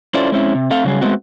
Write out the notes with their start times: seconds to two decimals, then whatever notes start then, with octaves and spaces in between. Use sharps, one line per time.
0.14 C#4 E4 F4 A4 C5 D5
0.32 G#3 C4 C#4 E4
0.55 C3
0.71 A3 C4 A4 F5
0.84 C#3 F#3 G3 G#4
1.01 G#3 A3 B3 C4 F#4